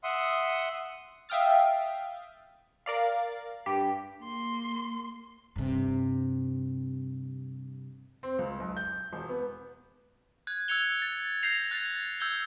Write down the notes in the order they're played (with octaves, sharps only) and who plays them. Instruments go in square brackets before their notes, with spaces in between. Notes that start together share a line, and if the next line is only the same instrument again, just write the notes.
[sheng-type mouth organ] E5 F#5 C6 D#6
[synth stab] E5 F5 G5 D#6 F6 A6
A#4 D5 F5
G2 G4
[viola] A#3 C6
[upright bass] G2 C3
[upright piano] C4
C#2
B1
G6
E1
B3
[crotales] F#6 G#6
E6 F#6 G#6 C#7 F7 G7
A6
G6 A#6 C7 F7
F#6 G#6 A6 C7 F7
E6 G6 G#6 G7